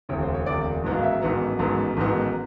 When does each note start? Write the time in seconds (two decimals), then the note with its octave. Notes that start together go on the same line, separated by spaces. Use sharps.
0.09 E1 D2 C3 C#5
0.22 C5
0.34 C#5
0.46 E1 D2 C3 D5
0.84 A1 G#2 D#3 F#3 B3
0.92 F5
1.03 E5
1.22 A1 G#2 D#3 F#3 B3
1.59 A1 G#2 D#3 F#3 B3
1.97 A1 G#2 D#3 F#3 B3